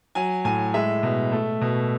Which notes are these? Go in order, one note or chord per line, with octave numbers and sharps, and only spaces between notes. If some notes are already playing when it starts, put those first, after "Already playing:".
F#3 G#5
A2 G#5
G#3 E5
B2
A3
B2